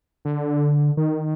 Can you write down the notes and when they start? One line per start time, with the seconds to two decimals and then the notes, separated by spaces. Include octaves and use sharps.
0.25 D3
0.97 D#3